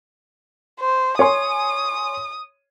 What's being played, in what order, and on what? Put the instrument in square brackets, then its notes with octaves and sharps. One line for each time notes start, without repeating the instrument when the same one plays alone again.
[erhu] C5
[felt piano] C#5 G#5 C6 [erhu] D#6